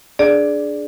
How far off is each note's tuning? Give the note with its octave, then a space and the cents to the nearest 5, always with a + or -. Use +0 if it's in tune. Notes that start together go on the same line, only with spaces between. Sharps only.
D4 +0 G#4 +15 D5 +0